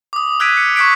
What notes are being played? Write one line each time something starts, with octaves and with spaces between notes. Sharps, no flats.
D6 D#6
E6 F#6 G#6 B6 D7 D#7
C#7
C#6 D6 F#6 G#6 B6 D7